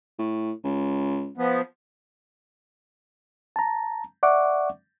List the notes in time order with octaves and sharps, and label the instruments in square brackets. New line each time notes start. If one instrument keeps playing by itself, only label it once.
[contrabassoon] A2
C#2
[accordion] F3 B3
[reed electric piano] A5 A#5
D5 E5 F#5 C#6 D6